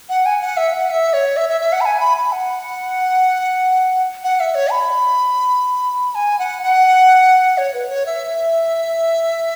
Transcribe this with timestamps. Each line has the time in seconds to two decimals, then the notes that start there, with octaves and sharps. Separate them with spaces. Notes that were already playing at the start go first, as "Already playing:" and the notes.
0.09 F#5
0.26 G#5
0.41 F#5
0.57 E5
0.73 F#5
0.90 E5
1.13 C#5
1.37 E5
1.49 E5
1.61 E5
1.73 F#5
1.81 B5
1.85 G#5
2.00 B5
2.17 B5
2.32 F#5
4.24 F#5
4.40 E5
4.55 C#5
4.71 B5
6.15 G#5
6.39 F#5
6.63 F#5
7.58 C#5
7.74 B4
7.89 C#5
8.06 E5